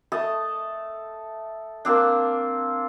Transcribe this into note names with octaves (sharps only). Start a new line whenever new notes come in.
A3 A5 D#6
A#3 C4 D4